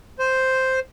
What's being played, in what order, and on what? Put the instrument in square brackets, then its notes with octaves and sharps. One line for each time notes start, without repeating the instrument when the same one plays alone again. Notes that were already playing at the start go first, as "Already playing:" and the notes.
[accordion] C5